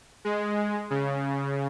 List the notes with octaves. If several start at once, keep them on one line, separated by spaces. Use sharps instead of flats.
G#3
C#3